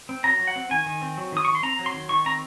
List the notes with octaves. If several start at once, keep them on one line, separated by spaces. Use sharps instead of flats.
C4
F#3 A#5
F#3
F#5
C4
D#3 G#5
D#3
C4
F#3
D#3 D#6
D#3 C#6
C6
C4 A#5
F#3
C6
D#3
D#3 C#6
C4 A#5